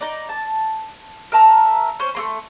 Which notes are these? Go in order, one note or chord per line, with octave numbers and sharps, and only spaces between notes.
D#4 D5
A5
A#4 E5 A5 A#5
C#4 C5
A3 A#3 C6